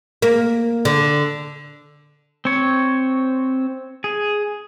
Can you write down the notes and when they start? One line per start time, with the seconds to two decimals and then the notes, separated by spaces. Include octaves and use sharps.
0.22 A#3
0.85 D3
2.45 C4 C#5
4.04 G#4